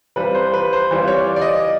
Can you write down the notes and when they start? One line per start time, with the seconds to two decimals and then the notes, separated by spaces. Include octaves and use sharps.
0.16 E3 G3 C4 F4 B4
0.35 C5
0.53 B4
0.73 C5
0.91 E3 G3 C4 F4 C5
1.07 C#5
1.16 D5
1.36 D5
1.42 D#5